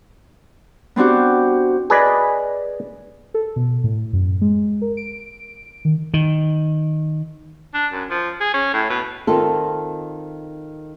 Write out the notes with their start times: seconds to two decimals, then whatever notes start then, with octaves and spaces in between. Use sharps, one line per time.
0.96 B3 C4 D4 F#4 G4
1.90 G#4 B4 D5 D#5
3.34 A4
3.56 B2
3.84 A2
4.13 F#2
4.41 G#3
4.82 A#4
4.97 D7
5.85 D#3
6.14 D#3
7.74 D4
7.92 F#2
8.10 F3
8.40 G#4
8.54 C#4
8.73 A2
8.89 B2
9.27 D#3 C4 F4 A4